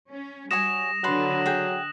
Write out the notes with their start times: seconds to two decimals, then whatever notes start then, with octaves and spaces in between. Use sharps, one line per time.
0.10 C#4
0.51 G3 F#4 C#5 G#5 D#6 A#6 E7
1.04 D3 F#3 A4 B4 C6 F#6 F#7
1.46 G#4 F#5 G5